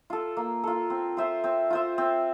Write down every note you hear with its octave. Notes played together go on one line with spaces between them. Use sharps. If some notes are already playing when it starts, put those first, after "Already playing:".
F4 A4
A#3
F4 A4
C4
F4 C5 E5
C4
F4 C5 E5
C4